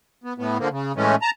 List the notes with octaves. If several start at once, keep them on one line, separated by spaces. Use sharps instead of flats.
B3
A2 B3
D3 F3 A#3
C#3
A2 E3 G#3 A3 C#4
A5 A#5